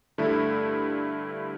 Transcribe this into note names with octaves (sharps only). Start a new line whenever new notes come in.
G2 D3 A3 E4